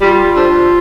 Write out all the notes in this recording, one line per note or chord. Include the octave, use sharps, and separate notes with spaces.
G3 F4
D4 A4 C5